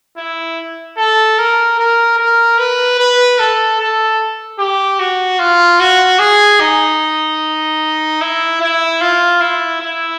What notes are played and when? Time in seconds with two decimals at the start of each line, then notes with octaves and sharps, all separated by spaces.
0.17 E4
0.98 A4
1.39 A#4
1.79 A#4
2.18 A#4
2.59 B4
2.99 B4
3.39 A4
3.80 A4
4.59 G4
5.00 F#4
5.39 F4
5.80 F#4
6.19 G#4
6.60 D#4
8.21 E4
8.61 E4
9.01 F4
9.41 E4
9.81 E4